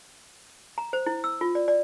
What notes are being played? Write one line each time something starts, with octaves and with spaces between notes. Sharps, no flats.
A#5
C5
E4
E6
F4
D5
D5